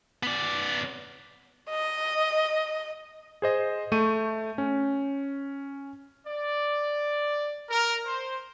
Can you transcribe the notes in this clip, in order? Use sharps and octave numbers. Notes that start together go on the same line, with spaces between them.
B3 D5
D#5
G#4 C5 D#5
A3 C#6 G6 D#7
C#4
D5
A#4
C5